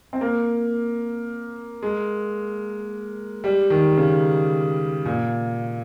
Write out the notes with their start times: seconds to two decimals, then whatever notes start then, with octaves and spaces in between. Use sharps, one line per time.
0.13 C4
0.21 A#3
1.82 G#3
3.44 G3
3.70 D#3
3.97 C#3
5.05 A#2